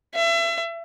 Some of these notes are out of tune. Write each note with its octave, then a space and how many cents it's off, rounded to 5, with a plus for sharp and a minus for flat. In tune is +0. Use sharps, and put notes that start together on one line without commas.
E5 +35